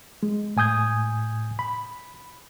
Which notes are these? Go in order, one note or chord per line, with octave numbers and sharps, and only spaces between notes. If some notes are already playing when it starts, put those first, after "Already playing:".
G#3
A2 G#5 D#6 G6 G#6
B5